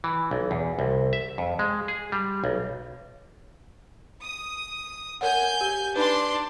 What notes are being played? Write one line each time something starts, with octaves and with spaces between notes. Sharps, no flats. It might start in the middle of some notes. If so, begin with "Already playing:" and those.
E3
B1
E2
C2
E5
F2
G#3
G#4
G3
B1
D#6
A#4 C#5 F#5 G#5 G6
G4
D4 D#4 B4 C6